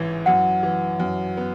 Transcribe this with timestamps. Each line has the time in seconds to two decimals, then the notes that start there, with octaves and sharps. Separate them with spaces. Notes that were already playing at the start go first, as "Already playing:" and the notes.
Already playing: A1 G#2 E3
0.26 F#2 F#5
0.63 E3
1.00 F#2
1.37 B3